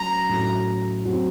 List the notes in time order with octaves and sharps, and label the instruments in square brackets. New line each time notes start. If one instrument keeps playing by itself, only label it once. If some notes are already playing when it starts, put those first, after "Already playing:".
Already playing: [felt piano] F#3 A3 C#4 F#4 [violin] A#5
[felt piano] A2 F#3 A3 C#4 F#4
F#3 C4 F#4